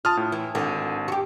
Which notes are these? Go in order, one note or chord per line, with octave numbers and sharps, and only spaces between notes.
F4 A5 D#6 F6
A2
E3
G#1 D3
F#4 G4